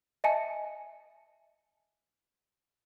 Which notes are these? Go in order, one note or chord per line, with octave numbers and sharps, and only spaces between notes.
D#5 E5 G#5 A5 C#7